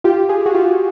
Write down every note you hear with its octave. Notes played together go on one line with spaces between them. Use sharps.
F4 G4
G#4
F#4 G#4
F4 G4